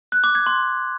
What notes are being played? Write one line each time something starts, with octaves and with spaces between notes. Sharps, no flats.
F#6
D6
G#6
C6